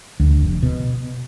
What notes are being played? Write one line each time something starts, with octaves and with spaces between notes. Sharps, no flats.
D2
F1
B2